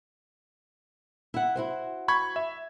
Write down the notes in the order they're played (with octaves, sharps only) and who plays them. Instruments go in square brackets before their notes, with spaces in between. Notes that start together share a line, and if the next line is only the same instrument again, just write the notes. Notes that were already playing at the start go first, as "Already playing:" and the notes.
[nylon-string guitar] E4 F#5
E4 F#4 C5
[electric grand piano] B5 C#6 G#6
E5